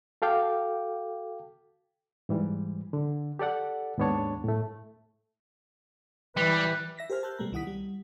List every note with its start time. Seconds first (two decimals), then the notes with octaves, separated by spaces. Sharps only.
0.22 F#4 A4 F5 G5 D6
2.29 G#2 E3 G3
2.93 D3
3.39 G4 A4 D5 F#5
3.98 D#2 G#2 B3 D4 C#5 A5
4.44 A2 A3
6.37 E3 G3 B4
6.97 E5 A#6 B6
7.10 G4 A#4 C5 G#5 F6
7.23 A5 C6 E6 F#6 G6
7.39 B2 G3 A3 A#5
7.52 C2 D#3 E4 F#5 D#6 B6
7.67 G3